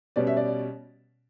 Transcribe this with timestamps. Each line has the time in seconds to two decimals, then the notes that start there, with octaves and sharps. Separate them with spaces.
0.16 B2 G3 C#4 D5
0.27 E5
0.37 D5